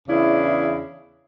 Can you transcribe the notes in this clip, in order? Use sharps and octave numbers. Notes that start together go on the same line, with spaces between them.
E2 C#3 D4 E4